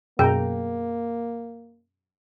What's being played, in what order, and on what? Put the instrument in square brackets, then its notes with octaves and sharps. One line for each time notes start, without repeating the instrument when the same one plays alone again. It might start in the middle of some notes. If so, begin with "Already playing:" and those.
[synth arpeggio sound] F#2 B2 [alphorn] A#3 [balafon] G#4 [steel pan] G5 A#5